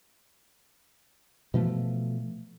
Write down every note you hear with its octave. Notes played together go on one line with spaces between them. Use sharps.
B2 E3 F3 A3